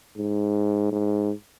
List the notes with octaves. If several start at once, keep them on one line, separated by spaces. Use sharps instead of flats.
G#2
G#2